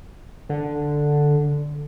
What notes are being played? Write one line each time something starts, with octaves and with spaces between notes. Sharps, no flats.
D3